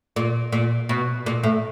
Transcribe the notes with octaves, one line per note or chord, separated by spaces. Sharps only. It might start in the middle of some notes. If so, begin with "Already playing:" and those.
A#2
A#2
B2
A#2
A2